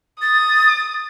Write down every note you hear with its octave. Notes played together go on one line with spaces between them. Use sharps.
D#6 A6